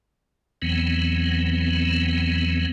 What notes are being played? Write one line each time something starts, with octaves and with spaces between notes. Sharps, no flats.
E2 E3 F#3 B3 C4